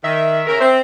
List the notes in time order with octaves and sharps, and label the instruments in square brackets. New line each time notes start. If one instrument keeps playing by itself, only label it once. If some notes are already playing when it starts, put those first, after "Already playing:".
[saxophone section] D#3 [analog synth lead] E5
[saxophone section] C#3 A#4
C4